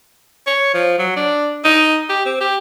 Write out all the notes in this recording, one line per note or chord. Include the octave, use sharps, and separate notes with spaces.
C#5
F3
F#3
D4
D#4
G4
C4
G4